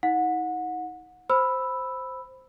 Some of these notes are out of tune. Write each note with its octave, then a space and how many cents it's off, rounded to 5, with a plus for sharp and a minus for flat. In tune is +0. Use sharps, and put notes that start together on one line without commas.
D#4 +45 F#5 -25
C5 +0 B5 +0 E6 +0